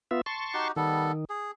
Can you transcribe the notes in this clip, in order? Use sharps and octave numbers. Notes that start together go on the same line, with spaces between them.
B3 F4 E5
A5 C6 C#6
D#4 F#4 G4
D#3 G3 B3 A4
G#4